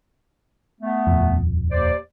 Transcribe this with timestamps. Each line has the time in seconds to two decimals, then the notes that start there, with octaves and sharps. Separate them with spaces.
0.81 A3 B3
1.07 D#1 F2
1.71 D#2 C5 D5